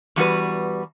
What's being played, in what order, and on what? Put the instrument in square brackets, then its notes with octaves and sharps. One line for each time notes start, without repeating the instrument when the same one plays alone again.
[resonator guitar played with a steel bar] E2 G3 F#4 B4